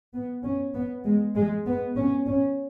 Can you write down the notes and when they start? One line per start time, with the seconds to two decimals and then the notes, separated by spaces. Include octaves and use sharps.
0.14 B3
0.44 C#4
0.74 B3
1.05 G#3
1.36 G#3
1.66 B3
1.96 C#4
2.27 C#4